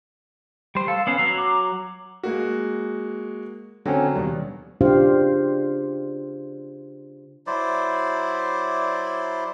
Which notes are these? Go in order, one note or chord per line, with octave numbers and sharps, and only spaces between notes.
G3 C5
A4 F5
B3 C#4 C7
F#3 A#5 E6
D6
G#3 A#3 F#4
D3 F#3 C4 C#4
D#2 B2 G3
C#3 D4 F4 G4 C5 F5
F#3 E4 C5 D5